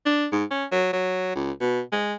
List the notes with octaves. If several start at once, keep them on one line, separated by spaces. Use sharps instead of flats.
D4
G#2
C#4
F#3
F#3
C#2
B2
G#3